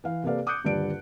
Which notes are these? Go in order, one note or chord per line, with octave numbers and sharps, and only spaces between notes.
E3 F5
C3 A#3 A4 B4 D5 F5
D6 D#6 F#6 G6 C#7
D#1 G2 D3 G3 D5 D7